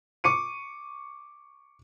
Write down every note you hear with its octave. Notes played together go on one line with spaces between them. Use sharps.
C#6 D6 C#7 D#7